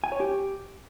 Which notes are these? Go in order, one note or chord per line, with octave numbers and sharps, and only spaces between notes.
G#5
C#5
G4